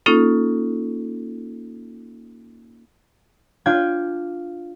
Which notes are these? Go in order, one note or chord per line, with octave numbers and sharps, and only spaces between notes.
A#3 C#4 D#4 F4 A4
D4 F4 G5 G#6